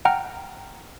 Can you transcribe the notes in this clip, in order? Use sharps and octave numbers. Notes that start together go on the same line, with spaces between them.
F#5 G5 A#5 F6